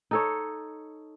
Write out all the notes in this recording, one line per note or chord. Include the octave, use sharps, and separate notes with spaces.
D#4 A4 C#5